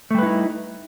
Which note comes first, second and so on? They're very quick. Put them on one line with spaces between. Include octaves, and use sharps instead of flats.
A3 G3 B4 E4 D#4